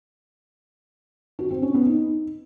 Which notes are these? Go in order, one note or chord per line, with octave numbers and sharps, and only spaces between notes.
F#4
C4
C#4
B3
D#4